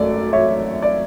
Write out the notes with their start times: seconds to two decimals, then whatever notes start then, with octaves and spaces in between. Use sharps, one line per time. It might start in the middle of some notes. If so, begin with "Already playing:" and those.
Already playing: G#1 F#2 A3 D5
0.33 C#5 E5
0.82 D5